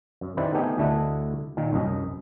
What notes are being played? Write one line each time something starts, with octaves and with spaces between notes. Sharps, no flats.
F#2
D#3 C4 E4 G4 B4 D5
A3 B3 D#4 G4 G#4
D2 D3 A3 D4 E4 D#5
A#2 D#3
C2 F#2 D#5